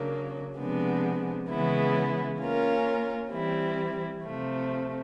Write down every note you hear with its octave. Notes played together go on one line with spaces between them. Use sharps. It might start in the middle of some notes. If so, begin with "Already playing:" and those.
Already playing: C#3 F#3 A#3 D4
C3 F3 G#3 B3 D4
C#3 E3 G#3 B3 E4
A#3 C#4 F4 A#4
E3 G3 C4 E4
C3 F3 A3